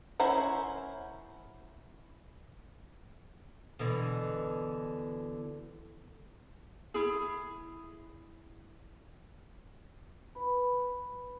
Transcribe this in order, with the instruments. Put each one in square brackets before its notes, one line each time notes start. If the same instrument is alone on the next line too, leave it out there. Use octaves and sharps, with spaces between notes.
[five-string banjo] C#4 E4 A#4 C5 F#5
[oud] B2 D3 E3
[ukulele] E4 G#4
[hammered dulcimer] B4